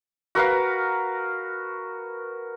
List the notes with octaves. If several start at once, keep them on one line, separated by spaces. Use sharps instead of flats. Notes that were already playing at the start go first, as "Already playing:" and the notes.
F#4 A#4 B4 F5